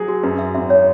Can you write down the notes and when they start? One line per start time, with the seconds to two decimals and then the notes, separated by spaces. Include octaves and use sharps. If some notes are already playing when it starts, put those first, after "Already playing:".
Already playing: F#3 G#4
0.08 F#4
0.23 F#2 B4
0.39 E5
0.55 G#1 E5
0.70 C#5